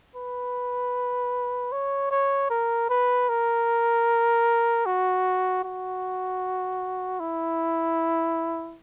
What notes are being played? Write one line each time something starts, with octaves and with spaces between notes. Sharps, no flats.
B4
C#5
C#5
A#4
B4
A#4
F#4
F#4
E4